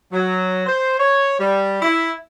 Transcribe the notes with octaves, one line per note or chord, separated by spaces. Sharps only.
F#3
C5
C#5
G3
E4